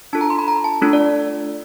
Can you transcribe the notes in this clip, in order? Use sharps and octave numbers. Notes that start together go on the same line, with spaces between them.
D4 F4 A4 A5
A#5
C6
B5
A#5
A5
A3 D4 F4 A4
D5